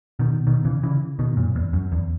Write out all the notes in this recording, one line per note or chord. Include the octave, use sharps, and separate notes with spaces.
B2 D#3
B2 D#3
C#3 E3
C#3 E3
B2 D#3
F#2 A#2
E2
F#2
E2